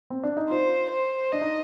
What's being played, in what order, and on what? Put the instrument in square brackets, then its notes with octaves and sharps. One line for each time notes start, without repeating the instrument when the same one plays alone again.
[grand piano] C4
D4
D#4
[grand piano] F4 [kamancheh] C5
[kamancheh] C5
[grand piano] D4 [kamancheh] D#5
[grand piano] D#4